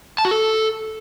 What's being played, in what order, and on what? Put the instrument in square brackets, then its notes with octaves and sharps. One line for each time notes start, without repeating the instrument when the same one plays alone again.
[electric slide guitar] A5
F#4
A4